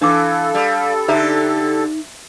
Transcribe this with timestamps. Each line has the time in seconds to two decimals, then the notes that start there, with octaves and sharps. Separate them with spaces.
0.01 E3 D4 A4 F5 D6
0.54 G3
1.08 D3 D#4 G4 C5 E5 A#5